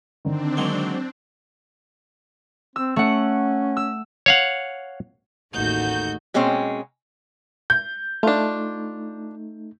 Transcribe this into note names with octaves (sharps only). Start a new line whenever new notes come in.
D3 D#3 C4 D4
F#3 G#3 A#3
C4 E6
A3 C#4 F#5
E6
C#5 F5 F#5
A1 D#2 A3 D#4 F#4 G6
B2 G#3 A#3 C4 C#4
G6
A3 D4 D#4 F4